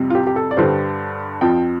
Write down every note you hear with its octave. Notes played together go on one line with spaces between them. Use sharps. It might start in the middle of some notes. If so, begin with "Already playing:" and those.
Already playing: F2 C3 G3
F4
G4
G4
A4
D5
G2 D3 G3 C5
F2 F3 G5